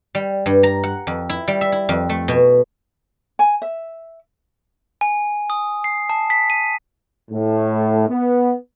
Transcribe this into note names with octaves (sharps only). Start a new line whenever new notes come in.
G3
G2
A#5
F#5
F2
E4
G3
E5
E4
F2
A3
B2
G#5
E5
G#5
D#6
C7
A5
B6
D#7
A2
B3